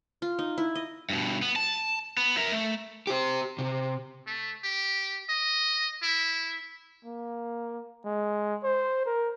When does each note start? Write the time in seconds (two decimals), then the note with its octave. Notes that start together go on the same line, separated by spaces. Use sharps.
0.22 F4
0.39 D#4
0.58 E4
0.75 D#5
1.10 G2 B2
1.42 B3
1.56 A5
2.17 B3
2.37 A#4 E5
2.52 A3
3.07 G4 C5
3.59 C3
4.27 A3
4.64 G4
5.30 D#5
6.03 E4
7.05 A#3
8.05 G#3
8.63 C5
9.06 A#4